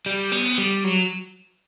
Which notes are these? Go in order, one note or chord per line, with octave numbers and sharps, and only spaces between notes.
G3
B3
G3
F#3